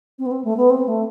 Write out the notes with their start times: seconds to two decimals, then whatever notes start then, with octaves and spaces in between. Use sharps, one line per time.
0.19 C4
0.26 B3
0.31 C4
0.44 A3
0.57 B3
0.70 C4
0.88 A3